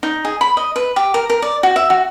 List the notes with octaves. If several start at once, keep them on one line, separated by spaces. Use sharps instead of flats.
D#4
G#4
B5
D#5
B4
G4
A#4
A#4
D5
F#4
E5
F#4